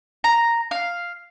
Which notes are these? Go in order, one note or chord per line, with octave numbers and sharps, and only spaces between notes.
A#5
F5